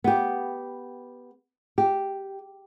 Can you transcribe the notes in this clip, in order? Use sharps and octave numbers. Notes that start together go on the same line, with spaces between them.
B3 G4
G4